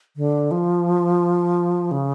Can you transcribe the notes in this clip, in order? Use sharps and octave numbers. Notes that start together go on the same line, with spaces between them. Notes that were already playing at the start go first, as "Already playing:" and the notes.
D3
F3
C#3